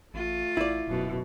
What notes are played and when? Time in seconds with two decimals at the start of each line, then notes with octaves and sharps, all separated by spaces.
0.14 A1 A3 F4
0.57 A1 E4 D5
0.87 D#1 F#2 B2